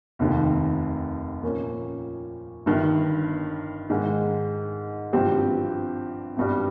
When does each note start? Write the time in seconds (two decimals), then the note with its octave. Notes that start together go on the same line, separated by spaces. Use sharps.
0.19 F1 D#2 D#3
1.43 A#2 F3 A#3 C#4
2.66 G1 G2 D#3
3.90 G#2 D#3 G#3
5.13 G#1 G2 F3 C4 G4
6.37 G#1 G2 G3